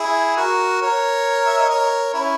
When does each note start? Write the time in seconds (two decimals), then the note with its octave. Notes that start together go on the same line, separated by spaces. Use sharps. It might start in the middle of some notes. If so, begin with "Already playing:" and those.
Already playing: E4 G#4
0.37 F#4 A#4
0.81 A#4 C#5
1.46 E5
1.58 D#5
1.69 A#4 C#5
2.14 C#4 E4